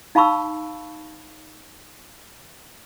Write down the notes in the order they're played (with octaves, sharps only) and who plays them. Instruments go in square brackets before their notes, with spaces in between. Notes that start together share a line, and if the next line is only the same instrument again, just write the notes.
[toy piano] D#4 F5 A5 B5 C#6 E6